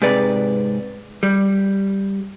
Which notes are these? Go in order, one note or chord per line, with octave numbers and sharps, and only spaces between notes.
G#2 C3 B4 D5
G3